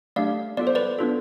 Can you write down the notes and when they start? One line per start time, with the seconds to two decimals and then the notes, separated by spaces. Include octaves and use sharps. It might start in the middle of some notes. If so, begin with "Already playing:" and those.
0.16 A3 D4 G4 D5 F5
0.57 B3 F4 A4 D5
0.67 C5
0.75 B4 D5
0.99 B3 D4 F4 A4